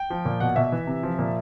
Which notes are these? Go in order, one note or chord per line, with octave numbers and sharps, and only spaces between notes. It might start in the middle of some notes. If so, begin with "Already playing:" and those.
Already playing: G5
F3
A#2
B2 F#5
B2 E5
E3
C3
F3
A#2